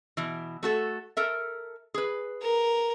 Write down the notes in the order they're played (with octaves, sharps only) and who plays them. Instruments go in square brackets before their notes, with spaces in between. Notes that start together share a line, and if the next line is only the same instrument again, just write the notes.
[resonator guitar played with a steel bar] B2 E3
A3 F#4 A4
A4 A#4 E5
G#4 B4
[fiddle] A#4